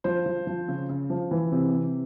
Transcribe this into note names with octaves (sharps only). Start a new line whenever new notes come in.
F3 C5
F3
F3
C#3
C#3
F3
E3
C3
C3